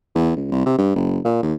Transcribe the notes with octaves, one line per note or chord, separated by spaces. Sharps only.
E2
C#2
C2
C3
G2
F#1
A#2
D#2